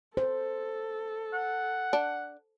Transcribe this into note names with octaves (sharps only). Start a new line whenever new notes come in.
A4 C5
F#5
D4